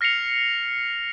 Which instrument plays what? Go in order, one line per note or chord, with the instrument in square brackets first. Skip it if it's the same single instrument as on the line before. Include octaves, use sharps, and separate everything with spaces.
[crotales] F6 A#6 C7 C#7 F7